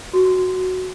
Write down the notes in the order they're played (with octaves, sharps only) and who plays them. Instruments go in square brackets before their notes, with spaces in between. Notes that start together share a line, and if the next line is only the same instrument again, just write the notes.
[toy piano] F#4